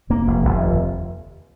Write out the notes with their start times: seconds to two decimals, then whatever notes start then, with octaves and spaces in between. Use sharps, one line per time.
0.10 F1 A#3
0.27 F1
0.44 F1
0.62 D#2